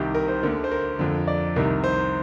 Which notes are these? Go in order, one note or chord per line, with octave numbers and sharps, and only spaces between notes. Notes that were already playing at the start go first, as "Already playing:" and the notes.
Already playing: C2 C3 D#3 G4
A#4
C5
D2 D3 A#4
C5
A#4
F2 D3
D5
C2 C3 D#3 A#4
C5